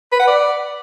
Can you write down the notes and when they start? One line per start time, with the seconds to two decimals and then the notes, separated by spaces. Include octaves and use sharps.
0.12 B4
0.20 F#5
0.27 D5